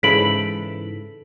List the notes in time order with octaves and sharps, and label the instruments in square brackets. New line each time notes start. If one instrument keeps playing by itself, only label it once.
[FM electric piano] G#2 C#3 E3 [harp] A4 B5 [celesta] B6 D7 F#7